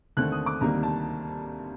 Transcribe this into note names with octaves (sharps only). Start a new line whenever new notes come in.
D#2 D3 A3 C4 F#6
D#6
D6
D2 C3 D#3 G3 A#3 A#5
A5